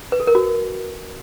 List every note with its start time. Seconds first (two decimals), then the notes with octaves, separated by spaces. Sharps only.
0.12 B4
0.20 A4
0.27 A#4
0.35 F#4